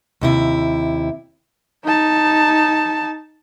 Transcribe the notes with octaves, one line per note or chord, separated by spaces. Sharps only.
D#2 C3 E4
D#4 A5